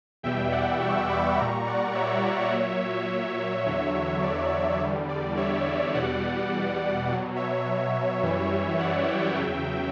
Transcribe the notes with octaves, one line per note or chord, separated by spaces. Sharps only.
E2 B2 G3 E5 G5
D5 F#5
C#6 E6
B5 D6
A#2 G3 A#5 C#6
D5 F#5
C#5 E5
A#2 F#3
E2 D3 F#3
D5
C#5
E2 D3 G3
D5
C#5 E5
E2 B2 G3 D5 F#5
B2 F#3
C#5 E5
F#2 E3 G3
D5 F#5
E5 G5
E2 C#3 F#3 E5 G5